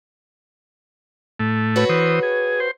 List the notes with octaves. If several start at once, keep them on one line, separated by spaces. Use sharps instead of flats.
A2 A3
F#4 B4 C#5
E3 C5 D#6
G#4
C5